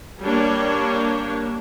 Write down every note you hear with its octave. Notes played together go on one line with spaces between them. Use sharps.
G3 A#3 D4 C#5